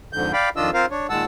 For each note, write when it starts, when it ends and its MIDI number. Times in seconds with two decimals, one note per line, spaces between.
0.13 0.32 41
0.13 0.32 44
0.13 0.32 50
0.13 0.32 91
0.33 0.49 74
0.33 0.49 77
0.33 0.49 79
0.33 0.49 83
0.56 0.70 41
0.56 0.70 51
0.56 0.70 62
0.56 0.70 65
0.56 0.70 75
0.56 0.70 88
0.74 0.86 60
0.74 0.86 65
0.74 0.86 70
0.74 0.86 72
0.74 0.86 77
0.91 1.07 62
0.91 1.07 73
1.10 1.25 46
1.10 1.25 51
1.10 1.25 56
1.10 1.25 78
1.10 1.25 81
1.10 1.25 88